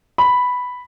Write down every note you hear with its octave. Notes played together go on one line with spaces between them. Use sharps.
B5